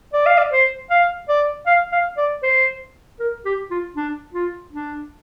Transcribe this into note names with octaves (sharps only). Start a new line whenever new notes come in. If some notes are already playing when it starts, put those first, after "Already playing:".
D5
F5
D5
C5
F5
D5
F5
F5
D5
C5
A#4
G4
F4
D4
F4
D4